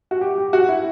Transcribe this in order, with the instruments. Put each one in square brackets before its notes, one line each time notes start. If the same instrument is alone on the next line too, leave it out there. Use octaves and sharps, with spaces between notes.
[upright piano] F#4
G4
G4
F#4
E4